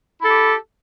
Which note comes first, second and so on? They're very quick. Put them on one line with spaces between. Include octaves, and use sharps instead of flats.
E4 A4 G4